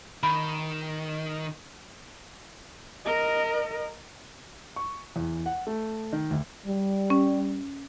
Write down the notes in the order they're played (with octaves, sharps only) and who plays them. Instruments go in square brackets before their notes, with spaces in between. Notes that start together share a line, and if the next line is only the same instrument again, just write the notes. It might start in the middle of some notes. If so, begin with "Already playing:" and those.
[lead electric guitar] D#3 [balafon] B5
[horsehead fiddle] A#4 D#5
[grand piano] C#6
E2
F#5
A3
D#3
D2
[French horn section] G3
[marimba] C#4